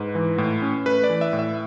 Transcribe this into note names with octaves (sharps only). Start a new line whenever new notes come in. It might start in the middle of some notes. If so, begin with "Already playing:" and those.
Already playing: G#2 B4
E3
A2
C#4
A3 B4
D5
E3
E5
A2
E5